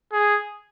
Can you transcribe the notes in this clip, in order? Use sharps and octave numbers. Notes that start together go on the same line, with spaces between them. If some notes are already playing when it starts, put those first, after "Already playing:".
G#4